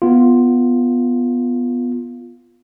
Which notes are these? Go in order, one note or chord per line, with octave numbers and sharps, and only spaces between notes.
B3 F4